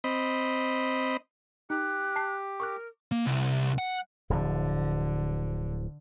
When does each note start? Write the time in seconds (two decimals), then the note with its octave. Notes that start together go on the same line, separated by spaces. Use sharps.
0.04 C4 D#5 B5
1.70 D#4 G4 F#6
2.16 A5 C7
2.60 A#4 C#6 D6 F#6
3.12 A#3
3.26 C2
3.78 F#5
4.30 D1 D3 F3